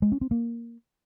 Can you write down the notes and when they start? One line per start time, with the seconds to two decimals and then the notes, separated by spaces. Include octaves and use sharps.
0.02 G#3
0.12 C#4
0.21 C4
0.31 A#3